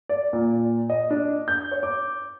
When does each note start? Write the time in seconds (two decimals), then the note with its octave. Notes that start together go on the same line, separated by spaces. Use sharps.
0.09 D5
0.33 A#2
0.90 D#5
1.10 D4
1.48 G6
1.71 C#5
1.83 D6